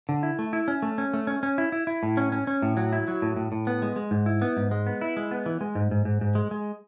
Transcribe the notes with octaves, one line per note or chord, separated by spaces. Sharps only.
D3
E4
A3
E4
C#4
A3
C#4
A3
C#4
C#4
E4
E4
E4
A2
C#4
C#4
C#4
A2
F#3
E4
F#3
A2
A2
A2
B3
G#3
G#3
G#2
E4
B3
G#2
G#3
B3
E4
G#3
B3
E3
G#3
G#2
G#2
G#2
G#2
G#3
G#3